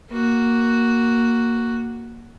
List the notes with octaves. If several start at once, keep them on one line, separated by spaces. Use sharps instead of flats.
A#3 F#4